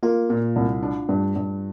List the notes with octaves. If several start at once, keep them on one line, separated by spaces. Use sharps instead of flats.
A#3 F4
A#2
C2
D4
G2
G2